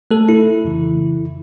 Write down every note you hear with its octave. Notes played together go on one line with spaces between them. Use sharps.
A3 A4
E4
F2 C#3 E3